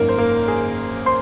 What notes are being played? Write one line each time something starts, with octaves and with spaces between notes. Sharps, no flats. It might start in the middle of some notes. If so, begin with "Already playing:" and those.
Already playing: G#1 F#2 D#3 A#3 A#4
C5
A#3 A#4
G#4
C5 C6